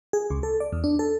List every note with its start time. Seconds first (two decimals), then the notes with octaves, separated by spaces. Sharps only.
0.13 G#4
0.30 C#2
0.43 A4
0.60 D5
0.72 E2
0.84 D4
0.99 A4